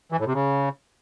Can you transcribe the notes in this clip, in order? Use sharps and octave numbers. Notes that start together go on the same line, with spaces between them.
E3
A2
C3
C#3